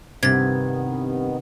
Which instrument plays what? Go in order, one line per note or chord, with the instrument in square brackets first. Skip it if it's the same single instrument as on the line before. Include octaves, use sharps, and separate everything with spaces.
[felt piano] C2 G2 [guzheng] C3 [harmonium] D#3 B3 [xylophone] G#6 A6